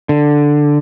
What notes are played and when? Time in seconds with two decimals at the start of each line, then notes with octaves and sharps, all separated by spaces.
0.09 D3